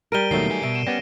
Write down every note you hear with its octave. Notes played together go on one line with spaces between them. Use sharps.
G3 A#4 D7 D#7 G7
D#2 B2 D#3 F#3 A3 C7
B3 G#5
B2 E5 D7
E7
G3 B3 C#4 A#6